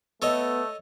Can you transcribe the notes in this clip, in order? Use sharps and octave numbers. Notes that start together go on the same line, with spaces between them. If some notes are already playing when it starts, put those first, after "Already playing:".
A3 B3 A4 C#5 D#5